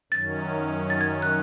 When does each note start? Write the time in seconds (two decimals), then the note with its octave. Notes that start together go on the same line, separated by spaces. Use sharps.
0.12 F#2 D#3 F#3 C#4 A6
0.90 A6
1.01 G#6
1.22 F#6